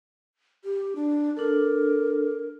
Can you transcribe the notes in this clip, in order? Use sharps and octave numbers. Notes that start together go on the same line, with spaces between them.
G4
D4
D4 A4 A#4